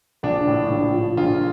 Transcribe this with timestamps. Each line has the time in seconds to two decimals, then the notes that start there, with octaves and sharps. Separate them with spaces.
0.23 A#1 D4
0.47 A2
0.70 A#1
0.94 F3
1.17 A#1 F4